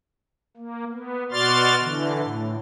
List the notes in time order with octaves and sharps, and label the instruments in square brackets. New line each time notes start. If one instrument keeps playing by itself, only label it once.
[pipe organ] A#3
B3
B2 F#4 D5 C6 F6 A6
D3 E3
A2